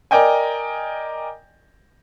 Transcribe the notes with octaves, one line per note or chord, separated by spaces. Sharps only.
A#4 D5 D#5 G5 G#5